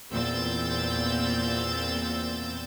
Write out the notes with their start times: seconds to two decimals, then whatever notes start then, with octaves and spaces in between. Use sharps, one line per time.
0.11 E2 A#2 C4 E6 G6 A6